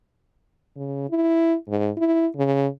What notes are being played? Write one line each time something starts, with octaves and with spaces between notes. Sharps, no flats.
C#3
E4
G#2
E4
C#3